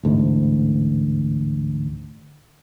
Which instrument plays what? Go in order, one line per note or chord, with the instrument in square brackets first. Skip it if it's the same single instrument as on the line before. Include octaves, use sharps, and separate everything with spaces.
[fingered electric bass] A1 D2 G#2